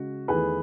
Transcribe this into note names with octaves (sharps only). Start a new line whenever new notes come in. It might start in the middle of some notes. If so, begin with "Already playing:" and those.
Already playing: C#3 G#3 F#4
E2 D#3 A3 G#4 B4